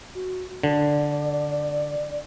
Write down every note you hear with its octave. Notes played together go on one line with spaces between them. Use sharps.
F#4
D3 D5